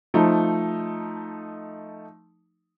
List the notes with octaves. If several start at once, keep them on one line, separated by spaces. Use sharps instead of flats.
F3 A3 D#4